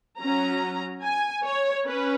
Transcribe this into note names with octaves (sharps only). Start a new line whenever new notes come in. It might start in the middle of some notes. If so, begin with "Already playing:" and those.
F#3 C#4 A#5
G#5
C#5
C#4 B4